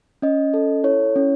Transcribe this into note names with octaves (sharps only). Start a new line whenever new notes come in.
C#4 D#5
A4
E4 C#5
C#4